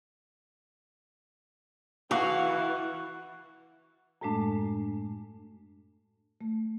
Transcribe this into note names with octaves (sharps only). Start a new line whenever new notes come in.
E3 F#4 F5 F#5
F#2 A2 G#3 A3 D4
A3